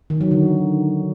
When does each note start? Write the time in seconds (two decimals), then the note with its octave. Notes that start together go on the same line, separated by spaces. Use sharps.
0.10 D#3
0.21 F#3
0.31 D3